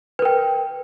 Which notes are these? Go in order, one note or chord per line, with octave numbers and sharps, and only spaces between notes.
A#4 B4 G5